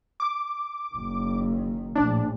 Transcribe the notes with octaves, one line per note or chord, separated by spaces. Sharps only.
D6
F#1 D#3
A#1 A2 D4